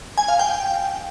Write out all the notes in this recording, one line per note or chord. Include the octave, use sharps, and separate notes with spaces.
G#5
F5
G5